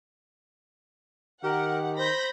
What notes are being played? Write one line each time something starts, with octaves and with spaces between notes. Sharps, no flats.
D#3 G4 A#4 F#5
C5 B5 G6 A#6